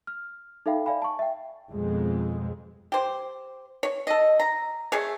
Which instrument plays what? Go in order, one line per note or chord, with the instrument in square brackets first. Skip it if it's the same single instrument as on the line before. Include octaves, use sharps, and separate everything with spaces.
[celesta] F6
D#4 A4 E5 F5 G5 B5
D5 E5 F5 G#5 B5
A5 C#6
E5 G5
[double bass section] F2 B2 G#3
[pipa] G4 C5
C#5
A4 D#5
A#5
A3 G#4 C#5